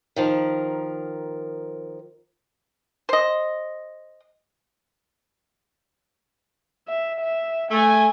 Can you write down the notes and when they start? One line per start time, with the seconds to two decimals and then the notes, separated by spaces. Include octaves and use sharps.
0.16 D#3 F3 A#4
3.09 C5 D#5
6.88 E5
7.21 E5
7.71 A3 G#5